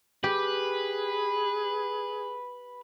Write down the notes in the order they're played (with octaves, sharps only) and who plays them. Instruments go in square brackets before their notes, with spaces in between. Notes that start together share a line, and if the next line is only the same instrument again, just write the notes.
[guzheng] G4 [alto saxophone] G#4 [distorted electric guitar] B4